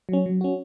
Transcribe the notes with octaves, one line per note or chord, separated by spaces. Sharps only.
F#3 C#4
F#3
C#4 F#4